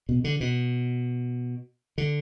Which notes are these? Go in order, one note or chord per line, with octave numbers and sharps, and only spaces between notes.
B2
D3
B2
D3